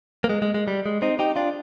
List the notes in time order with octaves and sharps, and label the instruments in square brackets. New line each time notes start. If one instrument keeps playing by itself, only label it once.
[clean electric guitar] A#3
G#3
G#3
G#3
G3
G#3
C4 D#4
D#4 G4
D4 F4